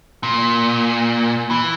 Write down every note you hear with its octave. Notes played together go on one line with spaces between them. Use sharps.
A#2
E3